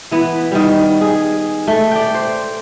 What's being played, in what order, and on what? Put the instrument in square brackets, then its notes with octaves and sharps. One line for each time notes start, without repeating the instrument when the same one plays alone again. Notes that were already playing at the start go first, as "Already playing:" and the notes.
[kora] E3 B3
D#3 G3
G#4
A3
D5 G5
C5